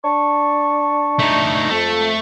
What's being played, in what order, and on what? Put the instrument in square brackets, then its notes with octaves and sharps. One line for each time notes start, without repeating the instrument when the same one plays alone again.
[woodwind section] D4 A5 C#6
[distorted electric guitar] A3 D#4
[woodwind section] F2 [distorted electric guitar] A3